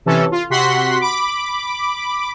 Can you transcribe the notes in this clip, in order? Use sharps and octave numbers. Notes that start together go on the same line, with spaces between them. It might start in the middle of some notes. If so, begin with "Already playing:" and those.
C3 E3 C#4 A4
F4
C3 F#4 F#5 C6 B6
B5 D6